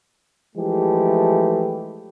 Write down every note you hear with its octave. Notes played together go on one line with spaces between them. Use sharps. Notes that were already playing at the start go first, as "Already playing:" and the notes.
E3 F3 G#3 A3 G4 A4